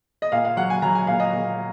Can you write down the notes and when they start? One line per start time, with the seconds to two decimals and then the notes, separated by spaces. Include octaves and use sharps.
0.22 D#5
0.32 A#2 F5
0.45 F5
0.57 F#3 F#5
0.70 G#5
0.82 F#3 A#5
0.95 G#5
1.07 A#2 F5
1.20 D#5
1.33 A#2